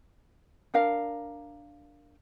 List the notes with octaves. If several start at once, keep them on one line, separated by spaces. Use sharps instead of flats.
D4 A#4 F5